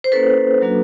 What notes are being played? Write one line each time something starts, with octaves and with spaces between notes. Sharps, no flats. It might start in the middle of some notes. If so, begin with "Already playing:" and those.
C5
A#3 C#4 E4 A4 B4
F#3 A#3 D4 F#4